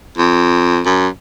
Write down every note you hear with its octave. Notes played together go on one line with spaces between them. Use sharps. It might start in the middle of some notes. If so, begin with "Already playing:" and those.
F2
F#2